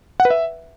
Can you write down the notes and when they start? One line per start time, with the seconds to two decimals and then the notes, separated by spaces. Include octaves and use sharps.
0.20 F#5
0.25 B4
0.30 E5